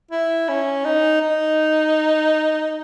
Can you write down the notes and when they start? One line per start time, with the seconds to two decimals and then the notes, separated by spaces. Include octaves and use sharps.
0.11 E4
0.48 C#4
0.85 D#4
1.21 D#4